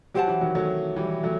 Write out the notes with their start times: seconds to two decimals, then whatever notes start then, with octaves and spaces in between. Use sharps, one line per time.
0.14 F#3 G4 C5 F#5 A5
0.28 E3
0.41 D#3 F#3
0.55 F#3 A3
0.96 E3 G3
1.23 F#3 A3